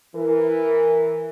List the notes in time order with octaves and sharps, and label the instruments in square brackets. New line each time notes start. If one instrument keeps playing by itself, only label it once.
[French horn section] E3 A#4